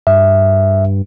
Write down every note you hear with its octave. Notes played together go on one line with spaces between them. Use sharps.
G2 E5